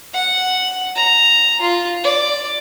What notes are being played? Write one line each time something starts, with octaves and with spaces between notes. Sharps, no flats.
F#5
A#5
F4
D5